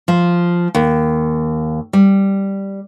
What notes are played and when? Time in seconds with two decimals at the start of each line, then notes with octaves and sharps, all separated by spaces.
0.08 F3
0.75 D#2
1.93 G3